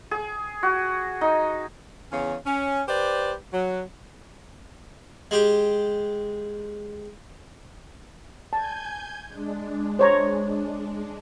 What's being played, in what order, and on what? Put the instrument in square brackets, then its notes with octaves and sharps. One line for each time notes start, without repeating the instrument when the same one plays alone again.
[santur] G#4
F#4
D#4
[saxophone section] E2 C#3 C#4
C#4
G4 B4 C5 D5
F#3
[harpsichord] G#3 G4
[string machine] G#5 G6 G#6 [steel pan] A5
[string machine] G#3 D4
[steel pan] C5 C#5 A#5